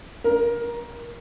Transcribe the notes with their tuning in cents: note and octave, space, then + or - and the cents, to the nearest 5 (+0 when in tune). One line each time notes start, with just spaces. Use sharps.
A#4 +20